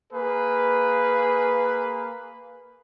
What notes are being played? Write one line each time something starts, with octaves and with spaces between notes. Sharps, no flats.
A#3 G#4 B4